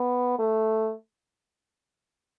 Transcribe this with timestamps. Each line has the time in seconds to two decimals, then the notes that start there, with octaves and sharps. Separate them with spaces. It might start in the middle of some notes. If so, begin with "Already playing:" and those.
Already playing: B3
0.39 A3